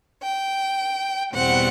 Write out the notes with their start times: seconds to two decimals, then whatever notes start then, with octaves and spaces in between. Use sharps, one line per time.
0.23 G5
1.34 E2 B2 G3 C4 F#5